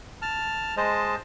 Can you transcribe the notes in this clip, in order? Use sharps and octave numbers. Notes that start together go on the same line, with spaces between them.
A5 F6
G#3 C5 D#5 A5